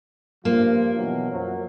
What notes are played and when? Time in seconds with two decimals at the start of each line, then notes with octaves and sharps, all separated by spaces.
0.45 G2 F3 A#3 F4
0.97 B2 E3 F#3
1.31 F#2 F3 F#3